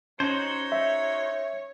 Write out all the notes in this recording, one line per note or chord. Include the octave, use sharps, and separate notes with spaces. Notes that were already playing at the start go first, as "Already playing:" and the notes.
C#4 D#4 F#4 C5 C#5
E5